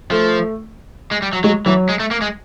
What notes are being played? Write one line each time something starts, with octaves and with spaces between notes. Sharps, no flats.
F3 A3
G#3
G3
F#3
F#3 G#3
E3 F#3
G#3
A3
A#3
G#3